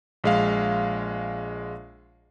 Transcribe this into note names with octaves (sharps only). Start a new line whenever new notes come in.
A#1 G#3 F5